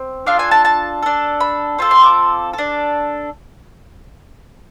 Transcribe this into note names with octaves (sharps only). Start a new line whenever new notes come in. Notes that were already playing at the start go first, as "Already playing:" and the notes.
Already playing: C4
D4 F4 A4 F5
G#5
A5
A5
D4 A4
B5
C4 F4 A4
C6
D6
D4 A4